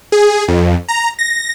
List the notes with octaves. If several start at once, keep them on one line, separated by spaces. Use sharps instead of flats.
G#4
F2
A#5
A#6